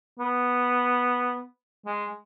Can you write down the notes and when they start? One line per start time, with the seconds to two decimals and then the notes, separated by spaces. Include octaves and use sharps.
0.19 B3
1.86 G#3